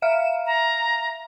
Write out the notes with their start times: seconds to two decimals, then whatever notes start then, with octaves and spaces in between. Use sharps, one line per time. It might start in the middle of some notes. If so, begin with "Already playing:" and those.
0.02 E5 F5 F6 E7
0.46 A#5